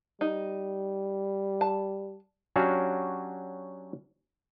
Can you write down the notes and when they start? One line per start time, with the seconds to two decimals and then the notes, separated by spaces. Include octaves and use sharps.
0.21 G3 D#4
1.61 A5
2.56 F#3 C#4 D4 F#4 G4 F5